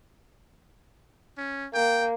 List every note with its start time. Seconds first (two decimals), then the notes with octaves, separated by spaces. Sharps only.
1.38 C#4
1.74 A#3 G5